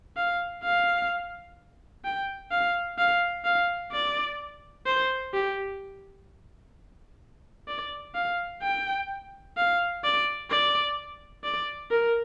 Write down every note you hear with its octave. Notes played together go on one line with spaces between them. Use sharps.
F5
F5
G5
F5
F5
F5
D5
C5
G4
D5
F5
G5
F5
D5
D5
D5
A#4